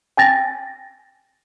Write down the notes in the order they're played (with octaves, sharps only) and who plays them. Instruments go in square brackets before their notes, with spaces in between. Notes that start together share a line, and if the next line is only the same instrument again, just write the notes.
[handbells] G5 G#5 A6 A#6